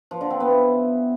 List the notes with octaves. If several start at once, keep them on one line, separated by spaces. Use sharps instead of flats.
F3
D3
C4
B3
E4